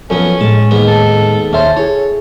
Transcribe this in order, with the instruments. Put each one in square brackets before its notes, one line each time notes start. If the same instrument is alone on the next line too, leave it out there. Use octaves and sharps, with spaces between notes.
[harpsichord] F#2 B3 [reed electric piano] F3 A4 [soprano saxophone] C#4
[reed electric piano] A2 G#3 [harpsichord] A5
[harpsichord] D#2 G#2 B3
[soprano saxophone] A4
[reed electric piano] D#2 E5 A5 [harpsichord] C#4 C5 [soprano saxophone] A4
[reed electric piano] E4 G#4 [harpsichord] C#5